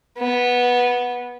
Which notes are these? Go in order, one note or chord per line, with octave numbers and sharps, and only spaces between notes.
B3